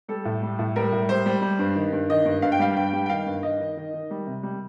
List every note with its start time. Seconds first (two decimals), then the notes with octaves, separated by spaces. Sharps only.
0.08 G3 A4
0.25 A2
0.43 G3
0.59 A2
0.76 G3 A#4
0.92 A2
1.09 G3 C5
1.26 G3
1.42 G3
1.59 G2
1.75 D#3
1.93 G2
2.10 D#3 D#5
2.25 G2
2.42 G2 F5
2.52 G5
2.59 G3 F5
2.76 G2 G5
2.93 G3
3.06 G5
3.10 D#3 F5
3.26 G2
3.43 D#3 D#5
3.60 D#3
3.77 D#3
3.94 D#3
4.11 G3
4.27 C3
4.43 G3